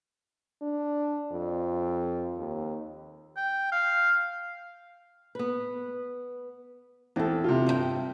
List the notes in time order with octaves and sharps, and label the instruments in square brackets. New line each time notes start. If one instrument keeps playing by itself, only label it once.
[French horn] D4
F2
D#2
[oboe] G5
F5
[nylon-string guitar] B3 B4
[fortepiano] E2 [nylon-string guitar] C4 A4
[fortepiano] C3 F4
[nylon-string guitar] G2 A#4 G5